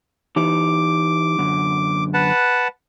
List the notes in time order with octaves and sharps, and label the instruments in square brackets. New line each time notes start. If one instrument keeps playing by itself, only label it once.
[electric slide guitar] E3 D#4 G4 [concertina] D6
[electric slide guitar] F#2 D3
[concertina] B4 F#5 A5